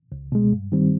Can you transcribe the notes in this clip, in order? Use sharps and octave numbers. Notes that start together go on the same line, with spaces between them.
C#2
B2 G#3
G2
D#3 G3 C4